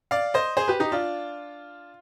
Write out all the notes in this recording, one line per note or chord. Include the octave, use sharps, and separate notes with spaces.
D5 F5
C5 D#5
G#4 C5
G4 B4
D#4 G4
D4 F4